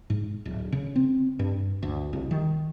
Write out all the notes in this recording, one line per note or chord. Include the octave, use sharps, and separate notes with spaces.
G#2
D1
C#3
C4
G2
D2
C2
D#3